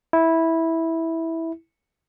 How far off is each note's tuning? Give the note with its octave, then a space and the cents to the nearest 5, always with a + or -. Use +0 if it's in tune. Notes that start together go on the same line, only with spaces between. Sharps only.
E4 -10